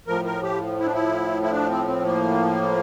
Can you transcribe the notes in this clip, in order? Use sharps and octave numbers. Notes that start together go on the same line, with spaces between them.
A2 F3 A#4
A#4
G4
E4
D4
E4
E4
D4
C4
C4
A#3